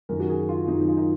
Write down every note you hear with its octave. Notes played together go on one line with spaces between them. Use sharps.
F#2 D#3 A#4
F#4
G#4
F4
F#2 D#3 D#4
D#4
F4
D#4